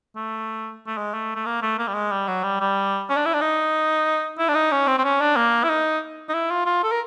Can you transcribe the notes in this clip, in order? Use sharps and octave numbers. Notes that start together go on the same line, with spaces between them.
A3
A3
G#3
A3
A3
A#3
A3
A#3
G3
G#3
G3
F#3
G3
G3
C#4
D4
E4
D4
D#4
E4
D4
D#4
C#4
C4
C4
C#4
D4
A#3
E4
D#4
D#4
E4
F4
F4
A4
A#4